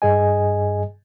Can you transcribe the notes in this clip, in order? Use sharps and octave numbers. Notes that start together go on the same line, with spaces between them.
G2 G#4 D#5 G#5